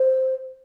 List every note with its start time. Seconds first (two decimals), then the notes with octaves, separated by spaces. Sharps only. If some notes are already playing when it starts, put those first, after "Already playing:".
Already playing: C5